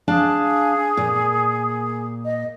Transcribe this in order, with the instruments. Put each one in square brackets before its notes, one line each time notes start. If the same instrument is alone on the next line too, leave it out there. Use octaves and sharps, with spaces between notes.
[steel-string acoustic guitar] D4 F5 A5 [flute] G#4
[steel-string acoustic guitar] A#2
[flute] D#5